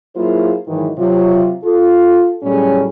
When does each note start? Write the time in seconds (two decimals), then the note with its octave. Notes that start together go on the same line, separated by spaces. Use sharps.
0.15 F#3 A#3 E4 F4 G#4 C5
0.68 G#2 D#3 E3 F#3
0.98 C3 F#3 F4
1.64 F4 A4
2.43 A2 F#3 G3 C#4 G#4 A4